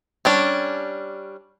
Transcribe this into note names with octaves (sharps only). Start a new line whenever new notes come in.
G3 C#4 D4